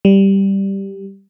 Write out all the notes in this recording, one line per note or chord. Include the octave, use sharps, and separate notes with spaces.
G3